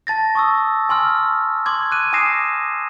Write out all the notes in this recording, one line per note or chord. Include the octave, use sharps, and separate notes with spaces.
A5 A6 A#6
C#6 D#6 E6
G#5 C6 E6 F6
C6 D6 G#6
F#6 D#7
G#5 D6 D#6 A#6 C7 E7